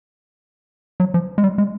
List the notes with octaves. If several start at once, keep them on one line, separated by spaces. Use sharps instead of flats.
F#3
F3
G#3
G3
G#3